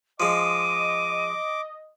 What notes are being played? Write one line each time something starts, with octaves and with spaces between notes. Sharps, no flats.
F3 G#3 D#5 D6 D#7